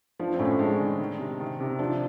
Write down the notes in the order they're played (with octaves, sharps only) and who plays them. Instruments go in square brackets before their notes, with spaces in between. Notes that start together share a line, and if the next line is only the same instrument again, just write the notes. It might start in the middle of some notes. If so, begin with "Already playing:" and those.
[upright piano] F3 [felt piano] D4
[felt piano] C4
[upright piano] A2 [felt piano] C#4
[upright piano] G#3 [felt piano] D4
[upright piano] D#3
D#3
C3
D#3
C3
[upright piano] F3 [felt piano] D4